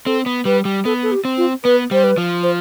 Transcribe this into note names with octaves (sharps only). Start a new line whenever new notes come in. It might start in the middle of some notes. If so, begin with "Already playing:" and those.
C4 A4
B3
G3 B4
G3
B3 A4
A4
G4
C4
F4
B3 B4
G3 C5
B4
F3
C5